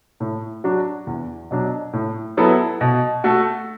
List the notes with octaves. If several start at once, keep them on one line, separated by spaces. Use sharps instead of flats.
A2
F#3 D4 F#4
E2
B2 F#3 D4
A2
F#3 B3 E4 A4
B2
A3 F#4 A4